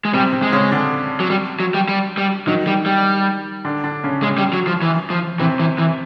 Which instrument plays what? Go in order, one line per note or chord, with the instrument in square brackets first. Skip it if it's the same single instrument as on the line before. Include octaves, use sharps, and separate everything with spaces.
[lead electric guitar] G#3
[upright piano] C3 C4 [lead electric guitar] G3
[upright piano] C3 C4
[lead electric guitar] G#3
[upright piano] C#3 C#4
D3 D4
[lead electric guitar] F#3
G3
F#3
G3
G3
G3
[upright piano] D#3 D#4 [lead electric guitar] F#3
[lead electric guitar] G3
G3
[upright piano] D3 D4
D3 D4
C#3 C#4
[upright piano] C#3 C#4 [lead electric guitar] G#3
[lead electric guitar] G3
F#3
F3
E3
F3
[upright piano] C3 C4 [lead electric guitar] E3
[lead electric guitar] E3
E3